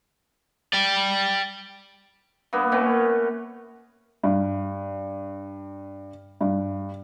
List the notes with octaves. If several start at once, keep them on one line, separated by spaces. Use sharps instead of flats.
D5 G5
G2 A#3 B3
A#2 A3 B3 C#4
G2
G2